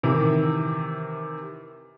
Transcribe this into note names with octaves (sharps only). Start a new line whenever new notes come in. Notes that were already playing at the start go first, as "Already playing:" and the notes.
C3 D#3 E3